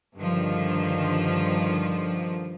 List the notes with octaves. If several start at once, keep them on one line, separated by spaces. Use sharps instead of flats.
G2 D3 D#3 F3